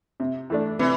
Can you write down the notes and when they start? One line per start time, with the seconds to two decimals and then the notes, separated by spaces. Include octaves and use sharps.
0.20 C3
0.50 E3 A3 D4
0.79 C3 E3